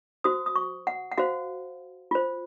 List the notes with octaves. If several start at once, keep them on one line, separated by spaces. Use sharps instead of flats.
F#4 C5 D#6
D#6
C#6
F#5
F#5
F#4 C5 F5
F4 C5